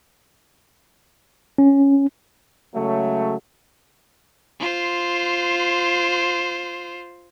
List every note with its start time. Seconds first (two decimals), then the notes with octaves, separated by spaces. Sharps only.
1.58 C#4
2.75 C#3 F#3 G#3 A3
4.59 F4 C5